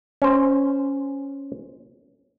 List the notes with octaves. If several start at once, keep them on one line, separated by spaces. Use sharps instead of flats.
C#4 C5